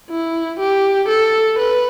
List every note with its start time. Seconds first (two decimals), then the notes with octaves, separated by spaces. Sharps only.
0.10 E4
0.60 G4
1.09 A4
1.59 B4